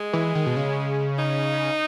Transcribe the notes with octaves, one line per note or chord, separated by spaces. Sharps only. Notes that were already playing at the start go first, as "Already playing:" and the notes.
Already playing: G#3
E3
D#3
B2
C#3
D#4